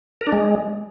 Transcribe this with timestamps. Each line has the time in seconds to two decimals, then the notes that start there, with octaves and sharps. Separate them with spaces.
0.21 A#4
0.27 D4
0.32 G#3